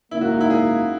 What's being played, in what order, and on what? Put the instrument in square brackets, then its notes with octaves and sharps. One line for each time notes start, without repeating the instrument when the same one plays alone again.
[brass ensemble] G#1 F#2 C#3 F#3 A#3 [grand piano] E4
[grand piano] F#4
D#4
E4
G#4